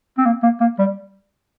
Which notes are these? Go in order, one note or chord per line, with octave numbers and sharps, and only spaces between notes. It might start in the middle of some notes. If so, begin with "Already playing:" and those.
C4
A#3
A#3
A#3
G3